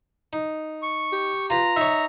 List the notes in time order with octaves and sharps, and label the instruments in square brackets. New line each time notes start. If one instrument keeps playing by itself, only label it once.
[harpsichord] D#4
[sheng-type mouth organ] C#6
[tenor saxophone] G4
[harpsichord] F4 B4 [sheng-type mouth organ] A#5
[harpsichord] D#4 C#5 [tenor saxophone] E5